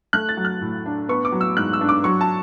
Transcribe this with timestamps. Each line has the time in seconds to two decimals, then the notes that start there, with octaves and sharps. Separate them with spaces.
0.13 A3 F#6
0.29 A6
0.37 F#3
0.45 F#6
0.61 A2
0.86 D4
1.09 B3 C#6
1.25 D6
1.32 F#3
1.41 E6
1.57 G#2 F#6
1.73 E6
1.81 D4
1.89 D6
2.04 F#3 C#6
2.21 A5